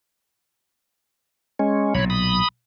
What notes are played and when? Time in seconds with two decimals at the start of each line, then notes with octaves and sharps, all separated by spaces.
1.59 G#3 C#4
1.95 B1 A#2 C#5 B5
2.10 B5 D#6